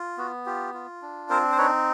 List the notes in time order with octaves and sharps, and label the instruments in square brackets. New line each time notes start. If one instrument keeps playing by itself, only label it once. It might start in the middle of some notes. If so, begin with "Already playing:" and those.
Already playing: [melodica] F4
B3 F#4
F4 G4
F4
D4
C4 A#4 C5
C5
D#4 B4 C#5